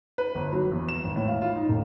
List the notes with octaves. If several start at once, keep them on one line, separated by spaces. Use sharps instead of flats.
B4
G1
F#3
E2
E7
G#1
A2
F5
F4
D#4
D1